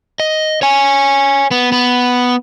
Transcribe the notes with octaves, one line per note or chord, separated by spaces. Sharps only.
D#5
C#5 G#5
B3
B3